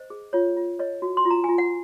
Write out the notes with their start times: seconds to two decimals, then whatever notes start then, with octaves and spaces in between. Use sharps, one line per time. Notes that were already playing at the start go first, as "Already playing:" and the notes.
Already playing: C5 D#5
0.10 G#4
0.33 F4 C#5
0.57 F4
0.79 C#5 D#5
1.02 F#4
1.17 C6
1.25 F4
1.31 A#5
1.44 F4 G#5
1.58 F#5